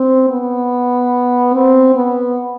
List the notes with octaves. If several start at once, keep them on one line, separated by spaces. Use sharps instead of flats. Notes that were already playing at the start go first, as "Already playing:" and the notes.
Already playing: C4
B3
C4
B3